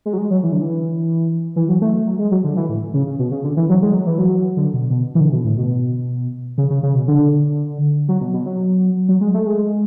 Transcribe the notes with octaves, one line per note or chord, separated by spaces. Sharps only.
G#3
F#3
G#3
F#3
E3
D3
E3
E3
F#3
A3
F#3
G#3
F#3
D3
E3
A2
C#3
C#3
B2
C#3
D3
E3
F#3
G#3
F#3
E3
F#3
D3
B2
B2
E3
D3
B2
A2
B2
C#3
C#3
C#3
B2
D3
F#3
B2
B2
F#3
F#3
G#3
A3
G#3